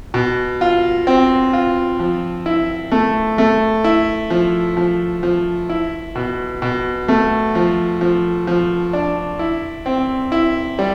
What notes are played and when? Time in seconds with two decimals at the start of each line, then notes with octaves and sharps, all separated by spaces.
0.14 B2
0.61 F4
1.07 C4
1.53 F4
2.00 F3
2.46 E4
2.92 A3
3.38 A3
3.84 E4
4.30 F3
4.77 F3
5.23 F3
5.69 E4
6.15 B2
6.62 B2
7.08 A3
7.55 F3
8.01 F3
8.47 F3
8.93 D4
9.39 E4
9.86 C4
10.32 E4
10.79 G3